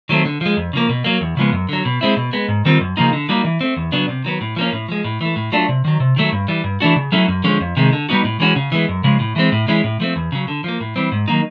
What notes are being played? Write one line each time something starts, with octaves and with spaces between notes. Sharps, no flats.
D#3 F#3 A3 C4
D3
F3 G#3
F2
C#3 F3 A#3
B2
F#3 A#3
E2
C#3 F3 G#3 B3
F#2
D3 F#3
B2
G#3 C4 E4
B2
G#3 B3
G#2
D#3 G3 C4 F4
F#2
C#3 F3 A#3 D#4
D3
G3 A#3 D#4 F#4
E3
A3 C4
E2
C#3 F#3 B3 D4
C3
D#3 F#3 B3
A2
F3 A#3 C#4
A2
F3 G#3
A2
E3 A3
A2
F#3 A3 D4 F4
C3
D#3 F#3
C3
D#3 F#3 A3
G2
E3 G3
G2
E3 A3 D4 F#4
C#3
F#3 A3 C#4 E4
F#2
D3 F3 G#3 C#4
F2
C3 D#3 G#3
D3
G3 B3 D#4 F#4
A2
E3 G#3 C#4 F#4
C#3
E3 G#3 B3
F#2
C#3 F3 G#3
A2
E3 G#3 C4
A2
E3 G#3 C#4 E4
A2
F3 A3 C4
E2
C#3 F#3
D3
F3 A#3
A2
E3 G3 C4
G#2
D#3 F#3 A#3 D#4